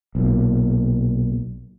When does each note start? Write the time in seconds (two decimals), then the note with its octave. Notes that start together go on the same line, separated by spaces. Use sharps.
0.15 B1 A#2